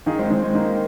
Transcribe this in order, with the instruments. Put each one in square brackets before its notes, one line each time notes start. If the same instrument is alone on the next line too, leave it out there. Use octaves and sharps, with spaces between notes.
[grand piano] D#3 F4 G#4
G#3 C4
D#3 G#3 C4
G#3
D#3 A#3